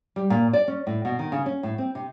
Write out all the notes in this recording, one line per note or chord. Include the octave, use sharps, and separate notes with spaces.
G3
A#2
D5
C#4
A2
B2
D#3
C#3
C#4
A2
C4
C3